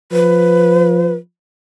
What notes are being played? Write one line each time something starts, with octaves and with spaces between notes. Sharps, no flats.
F3 B4